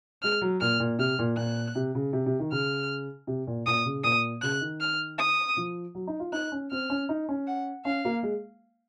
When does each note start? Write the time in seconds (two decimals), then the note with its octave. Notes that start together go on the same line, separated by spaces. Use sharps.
0.22 G#3 F6
0.42 F#3
0.61 A#2 F6
0.80 A#2
0.99 C3 F6
1.19 A#2
1.37 A#2 F#6
1.75 C3
1.95 C#3
2.13 C3
2.26 C3
2.39 D#3
2.52 C#3 F6
3.27 C3
3.47 A#2
3.66 A#2 D#6
3.86 C#3
4.04 A#2 D#6
4.42 C#3 F#6
4.61 D#3
4.81 F6
5.18 D#6
5.57 F3
5.95 F#3
6.07 D#4
6.20 F4
6.32 D#4 F#6
6.52 C#4
6.71 C4 F6
6.90 C#4
7.09 D#4
7.29 C#4
7.47 F#5
7.85 C#4 F5
8.05 A#3
8.23 G#3